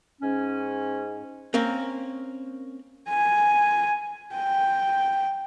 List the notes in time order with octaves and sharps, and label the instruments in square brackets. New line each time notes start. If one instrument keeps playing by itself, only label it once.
[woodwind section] G#2 C#4
[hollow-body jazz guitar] A#3 C4 C#4
[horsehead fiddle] G#5
G5